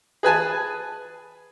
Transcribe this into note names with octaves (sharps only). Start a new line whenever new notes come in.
G#4 B4 G#5 A5